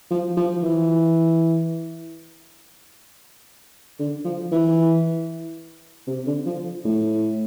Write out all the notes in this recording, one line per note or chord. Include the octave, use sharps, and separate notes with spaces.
F3
F3
E3
D3
F3
E3
C3
D3
F3
A2